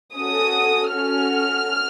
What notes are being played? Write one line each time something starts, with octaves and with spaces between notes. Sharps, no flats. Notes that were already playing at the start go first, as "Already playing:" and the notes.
C#4 F#4 A4 D#6
C#4 F#4 A4 F6